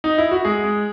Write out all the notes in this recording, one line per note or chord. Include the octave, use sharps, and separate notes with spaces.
D#4
E4
F#4
G#3 G#4
G#3